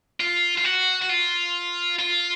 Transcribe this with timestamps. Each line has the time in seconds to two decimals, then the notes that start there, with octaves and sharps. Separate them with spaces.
0.20 F4
0.57 F4
0.64 F#4
1.02 F#4
1.09 F4
1.99 F4